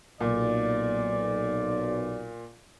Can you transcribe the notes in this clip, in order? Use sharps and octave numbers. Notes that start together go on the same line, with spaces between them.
B1 A#2 D5